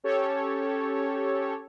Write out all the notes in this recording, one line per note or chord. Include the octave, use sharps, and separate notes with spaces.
C#4 G4 A4 C#5